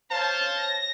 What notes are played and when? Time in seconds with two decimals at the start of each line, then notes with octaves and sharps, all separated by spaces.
0.11 C5 C#5 F5 A5 G6
0.57 A#6